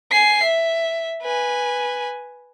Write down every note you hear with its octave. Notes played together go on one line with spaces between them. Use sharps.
G#5 C7
E5
B4 G#5